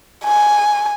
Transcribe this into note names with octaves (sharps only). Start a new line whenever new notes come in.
G#5